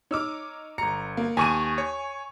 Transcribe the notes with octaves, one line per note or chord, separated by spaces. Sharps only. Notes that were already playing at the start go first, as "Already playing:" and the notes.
D#4 C#5 D6 E6 F6
G1 A#5 C#7
A#3
D#2 G#5 C#6 D#7
C#5